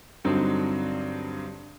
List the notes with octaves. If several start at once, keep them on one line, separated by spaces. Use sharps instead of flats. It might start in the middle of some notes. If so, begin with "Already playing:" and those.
G2 D3 F#3 C4 D#4